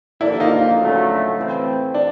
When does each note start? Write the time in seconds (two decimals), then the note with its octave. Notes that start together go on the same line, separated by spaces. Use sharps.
0.21 D#2 D3 F3 A#3 D4 E4
0.40 D#4 F4
0.79 D2 C#3 F#3 A3
1.37 A2 E3 A3 C4
1.94 D4